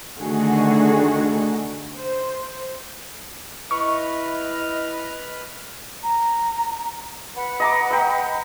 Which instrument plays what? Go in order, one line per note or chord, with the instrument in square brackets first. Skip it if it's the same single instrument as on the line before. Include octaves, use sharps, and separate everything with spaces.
[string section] D3 D#3 A3 F#4 G#4
C5
[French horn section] E4 [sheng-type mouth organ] B4 F6 [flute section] D#5 [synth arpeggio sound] C#6
[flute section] A#5
B4 F#5 B5
[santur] D#5 A#5 D6
D#5 G5